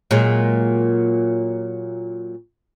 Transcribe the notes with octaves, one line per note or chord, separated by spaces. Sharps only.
A#2 F#3 G#3